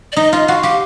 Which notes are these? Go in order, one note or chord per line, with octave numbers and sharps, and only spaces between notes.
D5
D#4 D#5
F4 D#5
F#4 F5
G4 F5